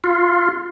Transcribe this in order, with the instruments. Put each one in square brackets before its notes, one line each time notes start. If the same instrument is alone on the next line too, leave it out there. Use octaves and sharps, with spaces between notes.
[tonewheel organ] F4